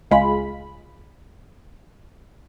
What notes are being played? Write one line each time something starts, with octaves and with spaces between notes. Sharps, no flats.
C#2 G#3 F4 B5